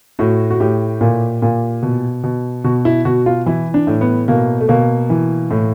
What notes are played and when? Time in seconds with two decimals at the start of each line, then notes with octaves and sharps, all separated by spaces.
0.19 A2 F#4
0.50 F#4
0.60 A2 G4
1.01 A#2
1.42 A#2
1.83 B2
2.24 B2
2.64 B2 F#4
2.85 E4
3.05 B2 F#4
3.26 F4
3.46 E3 E4
3.74 D4
3.87 A2
4.01 B3
4.28 B2 A#3
4.61 A3
4.69 B2 A#3
5.10 E3
5.51 A2